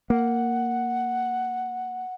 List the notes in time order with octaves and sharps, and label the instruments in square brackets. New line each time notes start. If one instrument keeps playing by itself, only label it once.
[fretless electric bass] A#3 [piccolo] F#5